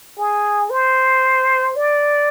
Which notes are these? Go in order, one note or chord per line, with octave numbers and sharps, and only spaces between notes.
G#4
C5
D5